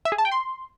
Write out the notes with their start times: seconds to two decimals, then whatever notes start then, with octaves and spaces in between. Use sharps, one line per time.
0.05 E5
0.12 G#4
0.18 A5
0.25 G5
0.31 C6